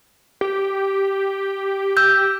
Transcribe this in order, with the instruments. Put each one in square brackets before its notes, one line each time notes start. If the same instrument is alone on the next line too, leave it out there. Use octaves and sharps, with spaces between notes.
[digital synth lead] G4
[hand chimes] E6 G6